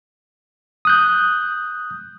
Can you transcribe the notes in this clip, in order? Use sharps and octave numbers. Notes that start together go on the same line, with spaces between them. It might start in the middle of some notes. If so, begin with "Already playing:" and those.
D#6 F#6 G6